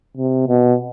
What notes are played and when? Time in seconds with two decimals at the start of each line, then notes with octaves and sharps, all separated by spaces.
0.17 C3
0.48 B2